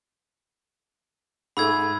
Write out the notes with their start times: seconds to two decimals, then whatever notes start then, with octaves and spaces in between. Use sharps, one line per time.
1.57 G#2 A3 B5 E6 G#6